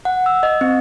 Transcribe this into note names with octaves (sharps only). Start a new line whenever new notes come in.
F#5
E6
D#5
C4